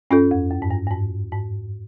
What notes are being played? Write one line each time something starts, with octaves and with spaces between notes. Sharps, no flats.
G2 C#4 F4 A4
F2
F#2
G#2
G2
G2
G#2
G#2